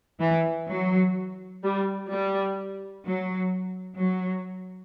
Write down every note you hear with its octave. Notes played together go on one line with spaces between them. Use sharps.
E3
F#3
G3
G3
F#3
F#3